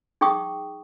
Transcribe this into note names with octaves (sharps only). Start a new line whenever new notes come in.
D#4 G#4 G5 C#6 D#6